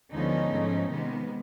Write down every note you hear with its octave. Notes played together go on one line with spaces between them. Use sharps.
D2 D3 F3 G#3 B3 C#4 D#4
G#2 F3 A3
C3 D#3 G#3 B3